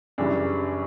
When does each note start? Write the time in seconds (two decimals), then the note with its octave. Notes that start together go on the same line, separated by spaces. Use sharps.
0.18 F#2 C#3 E3 G3 D4